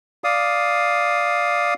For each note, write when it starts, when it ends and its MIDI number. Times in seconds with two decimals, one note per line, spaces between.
0.24 1.74 74
0.24 1.74 77
0.24 1.74 87